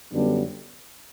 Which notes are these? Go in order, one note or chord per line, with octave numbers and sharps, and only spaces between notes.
F#2 D3 G3 B3 D4